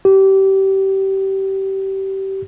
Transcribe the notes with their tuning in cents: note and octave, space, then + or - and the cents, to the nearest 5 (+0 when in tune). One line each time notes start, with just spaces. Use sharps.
G4 -25